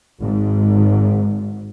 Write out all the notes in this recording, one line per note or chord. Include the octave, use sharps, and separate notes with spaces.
G#1 G#2